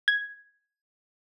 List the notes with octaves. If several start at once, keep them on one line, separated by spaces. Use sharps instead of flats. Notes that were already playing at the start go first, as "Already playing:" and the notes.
G#6